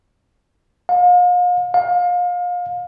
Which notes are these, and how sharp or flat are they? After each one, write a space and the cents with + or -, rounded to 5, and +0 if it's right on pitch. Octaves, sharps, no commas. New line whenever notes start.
F5 +40
F5 +30